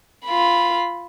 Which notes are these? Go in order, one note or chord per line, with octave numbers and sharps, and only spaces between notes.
F4 B5